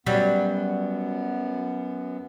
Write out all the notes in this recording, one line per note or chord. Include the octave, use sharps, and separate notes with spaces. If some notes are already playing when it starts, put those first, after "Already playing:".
F#2 F#3 G3 B3